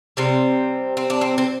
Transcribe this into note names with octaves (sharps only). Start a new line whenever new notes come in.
C3 G3 C4
C4
D4
C4
C4